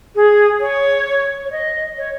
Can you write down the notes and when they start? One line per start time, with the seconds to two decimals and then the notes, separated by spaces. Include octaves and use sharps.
0.15 G#4
0.60 C#5
1.45 C#5
1.52 D#5
1.97 C#5